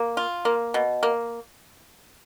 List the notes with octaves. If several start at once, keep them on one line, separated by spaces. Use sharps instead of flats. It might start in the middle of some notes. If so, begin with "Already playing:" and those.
Already playing: A#3
F4
A#3
B2
A#3